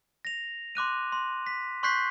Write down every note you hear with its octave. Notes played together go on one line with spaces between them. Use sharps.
A#6 F7
C6 D6 F#6 D#7
C6
B6
C6 C#6 F#6 G6 B6 C7